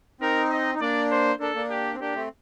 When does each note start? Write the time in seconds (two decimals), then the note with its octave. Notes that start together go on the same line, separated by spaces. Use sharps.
0.21 C4 D#4 A#4
0.51 D#5
0.75 D#4
0.81 A#3 D4 D5
1.11 C5
1.40 A#3 D4 A4
1.55 A#3 D4
1.70 G4
1.95 C4
2.01 A#3 D4 G4
2.15 A3 C4